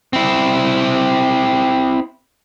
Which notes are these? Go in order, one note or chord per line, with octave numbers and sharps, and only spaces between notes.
C4 E4